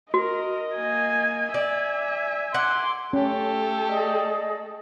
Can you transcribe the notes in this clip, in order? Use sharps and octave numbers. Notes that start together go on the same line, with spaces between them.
F#4 A#4 D#5
A#3 G#5
D5 E5 G#5
F#5 C6 D6
A3 C#4 G4 A4
G#4 D5 D#5